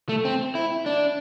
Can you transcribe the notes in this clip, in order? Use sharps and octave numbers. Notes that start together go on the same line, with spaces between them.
A3
C4
E4
D4